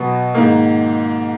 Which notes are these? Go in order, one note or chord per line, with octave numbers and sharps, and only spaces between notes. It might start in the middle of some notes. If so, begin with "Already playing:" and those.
Already playing: B2 F#3 B3
G#2 D#3 A#3